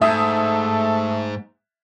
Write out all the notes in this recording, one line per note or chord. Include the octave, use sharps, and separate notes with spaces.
G#2 A3 A4 E5 D#6